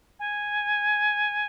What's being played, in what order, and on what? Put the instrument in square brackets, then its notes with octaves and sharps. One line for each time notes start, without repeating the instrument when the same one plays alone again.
[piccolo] G#5